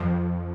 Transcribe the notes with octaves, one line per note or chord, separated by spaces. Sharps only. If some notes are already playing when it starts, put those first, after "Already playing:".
Already playing: F2 F3